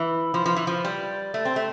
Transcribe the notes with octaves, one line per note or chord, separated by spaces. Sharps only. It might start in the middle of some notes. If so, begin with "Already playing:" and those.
Already playing: E3
F3
F3
E3
F3
G3
A3
C4
A3